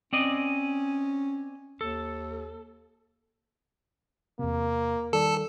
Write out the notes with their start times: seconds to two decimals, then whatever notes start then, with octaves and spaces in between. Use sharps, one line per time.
0.13 C4 C#4 D5 D#5
1.81 D#2 A4
4.39 E2 C3 A#3
5.13 D#3 G3 A4 D5